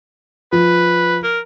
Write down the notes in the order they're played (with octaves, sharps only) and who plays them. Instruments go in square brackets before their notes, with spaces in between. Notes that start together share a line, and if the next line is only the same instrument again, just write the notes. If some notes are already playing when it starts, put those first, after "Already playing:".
[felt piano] F3 [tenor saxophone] B4
[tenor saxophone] A#4